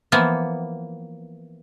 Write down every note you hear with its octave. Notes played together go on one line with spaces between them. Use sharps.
E3 F3 A#3 B3